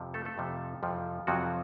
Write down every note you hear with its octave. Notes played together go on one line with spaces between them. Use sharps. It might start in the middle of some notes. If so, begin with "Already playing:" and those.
Already playing: F2 C3 F3
A3 A4
A3 A4
F2 C3 F3
F2 C3 F3
F2 C3 F3 F#3 F#4